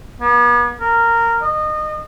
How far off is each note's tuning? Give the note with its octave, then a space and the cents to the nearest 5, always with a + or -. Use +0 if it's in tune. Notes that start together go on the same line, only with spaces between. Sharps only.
B3 -40
A#4 -10
D#5 -25